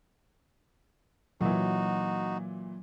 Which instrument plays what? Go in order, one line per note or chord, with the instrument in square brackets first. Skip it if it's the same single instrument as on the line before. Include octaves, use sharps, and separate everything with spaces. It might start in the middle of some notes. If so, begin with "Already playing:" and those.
[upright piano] A#2 E3 [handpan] F#3 [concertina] D#4 F#4